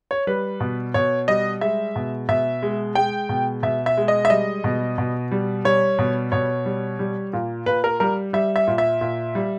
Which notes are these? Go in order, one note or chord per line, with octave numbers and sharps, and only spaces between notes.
C#5
G3 B4
B2
B2 C#5
G3 D#5
G#3 E5
B2
B2 E5
G#3
G#3 G5
B2
B2 E5
E5
G#3
D#5
E5
G3 D#5
B2
B2
G3
G3 C#5
B2
B2 C#5
G3
G3
A#2
A#2 B4
A#4
G3 A#4
G3 E5
E5
A#2
E5
A#2
G3